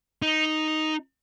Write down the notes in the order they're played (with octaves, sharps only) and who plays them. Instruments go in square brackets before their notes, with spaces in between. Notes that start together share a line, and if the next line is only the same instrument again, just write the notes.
[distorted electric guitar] D#4